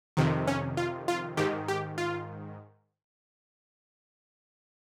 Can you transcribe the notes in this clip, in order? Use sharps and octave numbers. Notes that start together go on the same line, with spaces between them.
F2 C3 D#3
C#4
F4
F4
G#2 D#3 G4
G4
F4